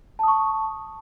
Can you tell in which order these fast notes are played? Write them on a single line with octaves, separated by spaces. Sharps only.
A5 D#6 C#6